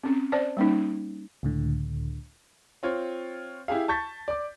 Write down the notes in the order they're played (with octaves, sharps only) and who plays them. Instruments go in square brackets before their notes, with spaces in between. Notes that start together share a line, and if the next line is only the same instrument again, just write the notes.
[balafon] C4 C#4
C5 D5 A5
G3 A#3 C#4 D#4
[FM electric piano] C#2 A2 D3
[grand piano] C4 F4 C#5
E4 G4 G#4 F5
A5 C#6 G6 A6 B6
D5 D6